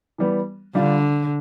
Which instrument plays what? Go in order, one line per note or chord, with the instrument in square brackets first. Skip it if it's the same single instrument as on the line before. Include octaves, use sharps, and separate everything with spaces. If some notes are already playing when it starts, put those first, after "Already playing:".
[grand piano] E3 G3 B3
[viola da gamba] D3 [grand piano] G3 D4 F4